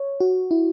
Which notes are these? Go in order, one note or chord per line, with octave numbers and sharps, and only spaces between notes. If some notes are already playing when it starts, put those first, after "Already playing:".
Already playing: C#5
F#4
E4